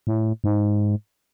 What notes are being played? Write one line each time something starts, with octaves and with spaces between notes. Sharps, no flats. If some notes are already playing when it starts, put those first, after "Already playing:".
A2
G#2